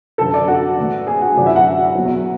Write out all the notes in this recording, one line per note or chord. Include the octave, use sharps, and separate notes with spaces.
F#2 D3 F#3 A4 A5
D4 D5
F#4 F#5
A2 E3
G#4 G#5
F#4 F#5
F#2 D3 F#3 D4 D5
E4 E5
F#4 F#5
E2 B2 F#3